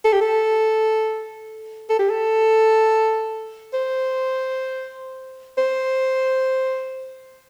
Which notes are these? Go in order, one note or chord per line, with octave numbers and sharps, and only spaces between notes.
A4
G4
A4
A4
G4
A4
C5
C5